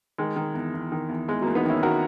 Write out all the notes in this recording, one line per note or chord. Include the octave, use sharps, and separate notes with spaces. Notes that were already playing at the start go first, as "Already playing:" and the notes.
D#3 G#3
D#3
E2
E2
D#3
E2
E2 G#3
F#3 A#3
E2
B3 D#4
D#3 C#4 E4
D#3 F#4 A#4